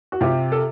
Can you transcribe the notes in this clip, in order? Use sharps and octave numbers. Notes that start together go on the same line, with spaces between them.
F#4
C3 F4 G4
A4